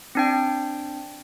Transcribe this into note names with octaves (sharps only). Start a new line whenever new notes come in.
C4 D4 G5